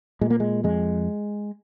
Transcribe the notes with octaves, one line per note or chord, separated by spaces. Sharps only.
A#2 G#3
A#3
G#3
F2 G#3